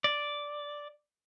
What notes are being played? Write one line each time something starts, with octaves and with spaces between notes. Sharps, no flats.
D5